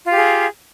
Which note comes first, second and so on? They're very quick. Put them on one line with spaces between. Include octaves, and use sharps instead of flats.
F4 F5 G4 G#4